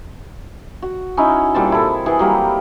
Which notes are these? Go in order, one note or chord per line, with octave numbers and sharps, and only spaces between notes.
F#4
C#4 D#4 E4
A#2 G3 C4 A5
E4 A4
E3 G#4 F#5
F#3 G3 A#3 G4